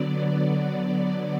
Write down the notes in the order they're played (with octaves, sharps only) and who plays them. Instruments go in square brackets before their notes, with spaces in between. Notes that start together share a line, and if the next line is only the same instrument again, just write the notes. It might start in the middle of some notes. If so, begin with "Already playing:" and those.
Already playing: [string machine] D3 F#3 B3 D5